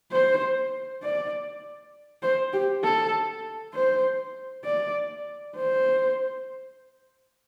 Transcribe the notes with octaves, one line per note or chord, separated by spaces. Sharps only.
C5
D5
C5
G4
A4
C5
D5
C5